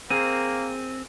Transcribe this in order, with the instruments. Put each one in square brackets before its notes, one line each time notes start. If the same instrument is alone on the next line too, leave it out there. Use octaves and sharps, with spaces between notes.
[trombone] A#3 [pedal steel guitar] C4 [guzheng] G#4 A#4 C5 [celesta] D#7